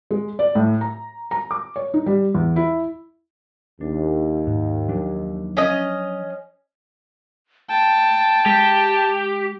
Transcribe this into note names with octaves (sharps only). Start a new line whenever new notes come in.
G#3
D5
A2
A#5
A#5
D6
C#5
D#4
G3
E2
E4
D#2 D4
G#2
F3 F#3 D4
C#4 D#5
G5 A5
G#3 G4